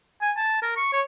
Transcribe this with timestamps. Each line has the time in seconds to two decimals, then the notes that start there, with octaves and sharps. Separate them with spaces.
0.22 G#5
0.38 A5
0.62 A#4
0.77 C#6
0.93 C#5